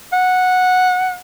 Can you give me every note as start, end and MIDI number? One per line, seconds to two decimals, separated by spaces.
0.13 1.18 78